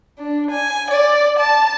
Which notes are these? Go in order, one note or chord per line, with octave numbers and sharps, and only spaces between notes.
D4
G#5
D5
A5